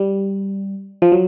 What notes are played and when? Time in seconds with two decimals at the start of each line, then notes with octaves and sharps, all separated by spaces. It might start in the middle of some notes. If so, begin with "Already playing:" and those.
Already playing: G3
1.02 F3
1.12 F#3